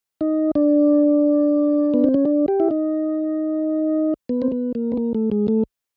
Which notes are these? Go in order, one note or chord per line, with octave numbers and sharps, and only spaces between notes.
D#4
D4
B3
C4
C#4
D4
G4
E4
D#4
B3
C4
B3
A#3
B3
A#3
A3
G#3
A3